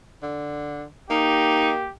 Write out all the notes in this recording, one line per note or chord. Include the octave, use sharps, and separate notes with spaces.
D3
A#3 D#4 G4